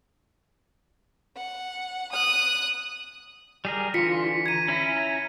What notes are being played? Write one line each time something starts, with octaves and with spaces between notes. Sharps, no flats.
F#5
D#6 F#6
G3 G#4 A#4
D3 E3 F4 C6 B6 C#7
A#5 G#6 D#7
C#4 E4